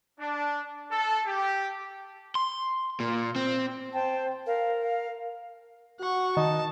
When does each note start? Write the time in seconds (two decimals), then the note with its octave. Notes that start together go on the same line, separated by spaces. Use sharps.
0.19 D4
0.90 A4
1.26 G4
2.35 C6
3.00 A#2
3.36 C4
3.94 C5 G5 A5
4.46 A#4 F5
4.83 F5
6.00 F#4 F#5 C#6
6.37 D#3 D#4 A5